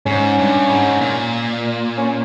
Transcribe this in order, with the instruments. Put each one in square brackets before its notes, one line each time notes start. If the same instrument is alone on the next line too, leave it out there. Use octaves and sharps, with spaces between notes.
[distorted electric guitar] G#2 [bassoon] C#4
[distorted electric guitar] G2
G#2
A#2
[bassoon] C#4